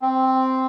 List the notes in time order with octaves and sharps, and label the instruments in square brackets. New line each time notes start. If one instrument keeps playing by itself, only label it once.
[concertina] C4